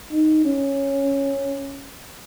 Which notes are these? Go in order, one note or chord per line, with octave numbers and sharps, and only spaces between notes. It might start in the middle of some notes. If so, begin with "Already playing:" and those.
D#4
C#4